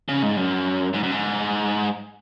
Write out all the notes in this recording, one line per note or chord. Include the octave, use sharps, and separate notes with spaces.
C#3
G#2
F#2
G#2
F#2
G#2